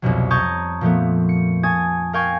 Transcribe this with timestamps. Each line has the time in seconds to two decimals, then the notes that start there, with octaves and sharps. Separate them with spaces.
0.02 C2 F2 B2 F#3
0.31 A5 A#5 C#6 D#6 G6 G#6
0.81 A#2 F3 A3 B3
1.29 C#7
1.63 G#5 A5 C#6 D#6 G#6 A6
2.13 A#4 F5 G5 G#5 C#6 G#6